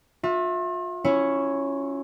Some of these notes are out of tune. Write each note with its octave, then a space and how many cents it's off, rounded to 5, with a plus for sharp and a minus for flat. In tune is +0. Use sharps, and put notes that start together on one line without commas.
F4 +40 E5 +0
C#4 +0 E4 +0 C#5 +0